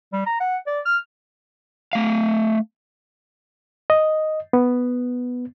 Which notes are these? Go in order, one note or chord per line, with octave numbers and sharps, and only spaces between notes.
G3
A#5
F#5
D5
F6
A3 F5
D#5
B3